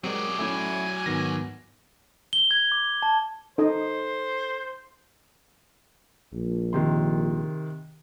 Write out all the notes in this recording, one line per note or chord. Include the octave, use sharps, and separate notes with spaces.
F#3 G#3 C4 G4 G#4 A#4 D5
A3 C#4 E4 E5 G#5
G#2 D#3 B3 A#6
G7
G#6
D6
A5
D#4 A4 C5 D#5
A#1
C3 D#3 C6